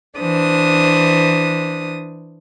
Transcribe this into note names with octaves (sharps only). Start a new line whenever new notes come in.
E3 D4 C5 D#6